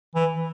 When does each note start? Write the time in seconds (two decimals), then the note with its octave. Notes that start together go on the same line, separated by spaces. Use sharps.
0.15 E3